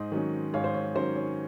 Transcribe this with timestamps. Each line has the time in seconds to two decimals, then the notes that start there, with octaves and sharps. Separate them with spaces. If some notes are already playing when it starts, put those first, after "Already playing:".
Already playing: G#2 C5 D#5
0.12 D#3 F#3 C#4
0.54 G#2 C#5 F5
0.64 C5
0.74 C#5
0.95 D#3 F#3 C#4 C5
1.16 C#5